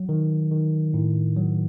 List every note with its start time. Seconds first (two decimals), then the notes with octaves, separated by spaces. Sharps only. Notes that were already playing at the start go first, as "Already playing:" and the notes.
Already playing: F#3
0.09 D#3
0.51 D#3
0.94 A2
1.37 F#3